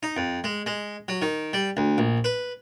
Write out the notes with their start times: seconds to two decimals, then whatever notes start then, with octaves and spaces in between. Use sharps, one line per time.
0.03 D#4
0.17 F2
0.44 G#3
0.66 G#3
1.08 F#3
1.22 D#3
1.53 G3
1.77 D2
1.98 A#1
2.24 B4